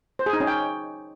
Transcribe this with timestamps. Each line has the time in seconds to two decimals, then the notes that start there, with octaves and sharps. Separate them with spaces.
0.19 C5
0.26 G#4
0.33 D#4
0.40 C#4
0.47 G5